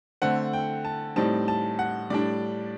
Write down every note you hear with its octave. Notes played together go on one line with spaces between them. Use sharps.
D3 A3 C4 F#5
G5
A5
A2 G3 C4 D#4 A5
A5
F#5
A2 G3 D4 D5